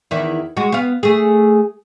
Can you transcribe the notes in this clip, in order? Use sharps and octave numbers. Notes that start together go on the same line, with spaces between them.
E2 D#3 E4
G#3 F#4
B3 F5
A3 G#4